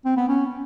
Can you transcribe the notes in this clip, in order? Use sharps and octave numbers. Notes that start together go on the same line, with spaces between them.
C4
B3
C#4